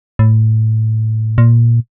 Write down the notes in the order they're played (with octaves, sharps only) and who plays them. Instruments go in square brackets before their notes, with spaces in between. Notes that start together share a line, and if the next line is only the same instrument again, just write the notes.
[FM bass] A2
A#2